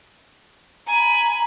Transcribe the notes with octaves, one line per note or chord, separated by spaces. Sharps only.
G#5 A#5 B5